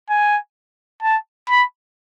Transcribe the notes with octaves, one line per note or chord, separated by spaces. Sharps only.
G#5
A5
B5